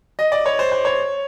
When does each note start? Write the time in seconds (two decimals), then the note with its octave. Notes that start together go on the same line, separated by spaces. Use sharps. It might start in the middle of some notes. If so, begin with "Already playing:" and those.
0.19 D#5
0.32 D5
0.46 C#5
0.59 C5
0.72 C5
0.85 C#5